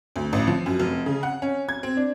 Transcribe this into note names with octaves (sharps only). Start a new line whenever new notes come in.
D2
A1
F3
F#2
F1
C#3
F#5
C#4
G#6
C4
D4